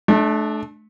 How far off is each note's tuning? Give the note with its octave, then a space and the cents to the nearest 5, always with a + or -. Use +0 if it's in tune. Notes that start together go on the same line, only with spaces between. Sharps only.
A3 -30 D4 +15